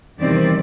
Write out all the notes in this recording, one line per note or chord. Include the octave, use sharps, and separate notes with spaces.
E2 C3 D#3 G3 C4 D5